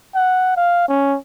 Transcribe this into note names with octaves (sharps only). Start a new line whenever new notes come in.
F#5
F5
C#4